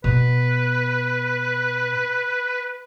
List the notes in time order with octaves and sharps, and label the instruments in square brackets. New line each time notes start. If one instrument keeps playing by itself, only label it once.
[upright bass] B2 [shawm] B4